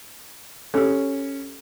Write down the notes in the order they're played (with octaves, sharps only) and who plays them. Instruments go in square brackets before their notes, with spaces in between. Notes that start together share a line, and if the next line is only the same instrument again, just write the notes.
[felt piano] C#4 [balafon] G4 A4